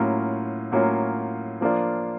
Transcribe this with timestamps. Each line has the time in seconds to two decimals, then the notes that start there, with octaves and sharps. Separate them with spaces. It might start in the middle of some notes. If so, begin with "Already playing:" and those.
Already playing: A2 F#3 A#3 C#4 F4
0.72 A2 F#3 A#3 C#4 F4
1.61 F3 A#3 D4 F4